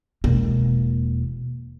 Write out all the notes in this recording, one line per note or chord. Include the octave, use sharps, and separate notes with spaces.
E1 A#3